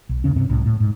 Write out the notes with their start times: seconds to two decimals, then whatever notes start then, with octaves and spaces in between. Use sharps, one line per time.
0.09 B1
0.24 D#2 C#3 C#4
0.36 G2 C3 C4 C#4
0.50 C2 A2
0.66 A2
0.80 G#2